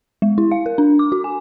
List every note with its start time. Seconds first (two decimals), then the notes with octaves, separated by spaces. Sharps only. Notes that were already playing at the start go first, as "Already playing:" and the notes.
0.22 G#3
0.38 E4
0.52 F5
0.66 A#4
0.78 D4
0.99 D6
1.12 F#4
1.24 G#5